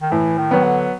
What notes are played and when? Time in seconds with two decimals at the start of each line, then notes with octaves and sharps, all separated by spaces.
0.02 D#3
0.11 A2 E3
0.38 D#3
0.51 F#3 B3
0.64 D3